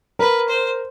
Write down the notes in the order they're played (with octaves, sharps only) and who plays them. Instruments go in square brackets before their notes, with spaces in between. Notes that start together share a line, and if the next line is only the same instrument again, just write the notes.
[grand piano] A#4 [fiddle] B4
[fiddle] C5